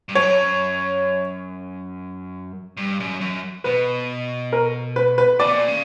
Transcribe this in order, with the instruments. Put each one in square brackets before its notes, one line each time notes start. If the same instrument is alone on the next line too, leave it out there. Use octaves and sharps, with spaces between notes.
[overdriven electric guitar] G2
[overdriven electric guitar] F#2 [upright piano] C#5
[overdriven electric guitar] G2
F#2
F#2
[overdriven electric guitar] B2 [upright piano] B4
[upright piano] A#4
B4
B4
[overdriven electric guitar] A#2 [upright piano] D5
[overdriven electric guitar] B2
A#2
C#3